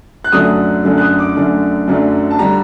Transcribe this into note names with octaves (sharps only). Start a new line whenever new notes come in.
F#6
F#2 D3 F#3 A3 D4 D#6
F#2 D3 F#3 A3 D4
F#6
D#6
D6
F#2 D3 F#3 A3 D4
F#2 D3 F#3 A3 D4
A5
D3 G3 A#5